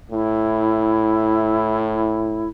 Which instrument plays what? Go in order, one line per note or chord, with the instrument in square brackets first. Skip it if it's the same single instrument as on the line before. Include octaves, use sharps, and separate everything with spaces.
[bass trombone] A2 [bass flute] E4